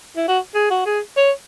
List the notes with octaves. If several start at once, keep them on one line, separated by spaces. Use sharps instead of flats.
E4
F#4
G#4
F#4
G#4
C#5